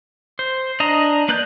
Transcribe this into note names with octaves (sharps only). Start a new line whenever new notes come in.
C5
D4 D#5 A#5
A#3 B4 D5 F#6 G6